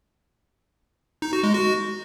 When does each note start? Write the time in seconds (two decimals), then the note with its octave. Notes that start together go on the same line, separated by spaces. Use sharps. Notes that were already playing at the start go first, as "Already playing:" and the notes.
1.22 D#4
1.33 F#4
1.43 G#3
1.54 F#4